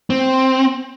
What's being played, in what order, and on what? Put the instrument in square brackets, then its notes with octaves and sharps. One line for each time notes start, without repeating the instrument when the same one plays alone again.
[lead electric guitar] C4